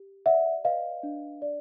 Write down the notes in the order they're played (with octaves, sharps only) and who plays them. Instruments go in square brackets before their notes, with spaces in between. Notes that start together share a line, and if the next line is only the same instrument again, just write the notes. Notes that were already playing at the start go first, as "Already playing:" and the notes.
Already playing: [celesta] G4
D5 E5 F#5
B4 D#5 F5
D4
D5